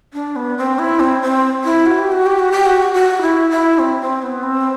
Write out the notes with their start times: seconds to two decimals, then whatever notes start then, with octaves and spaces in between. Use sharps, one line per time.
0.14 D4
0.36 B3
0.58 C4
0.79 E4
1.00 C4
1.22 C4
1.64 E4
1.86 F#4
1.99 G4
2.12 F#4
2.26 G4
2.39 F#4
2.52 G4
2.66 F#4
2.94 F#4
3.22 E4
3.50 E4
3.79 C4
4.01 C4
4.22 B3
4.43 C4